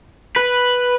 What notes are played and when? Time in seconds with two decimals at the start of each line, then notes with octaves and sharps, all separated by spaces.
0.36 B4